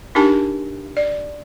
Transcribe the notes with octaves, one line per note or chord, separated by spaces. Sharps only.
D4 D#4 G4 A#4 G#5 A5
D5